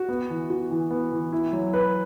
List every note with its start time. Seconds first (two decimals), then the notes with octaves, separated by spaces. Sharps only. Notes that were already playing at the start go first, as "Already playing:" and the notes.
Already playing: F#4
0.09 B3
0.30 E3
0.50 F#4
0.71 E3
0.91 B3
1.12 E3
1.32 E4
1.53 F#3
1.74 B4